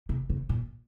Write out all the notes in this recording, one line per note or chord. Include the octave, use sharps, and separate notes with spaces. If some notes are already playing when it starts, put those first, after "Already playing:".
C3
C#3
A#2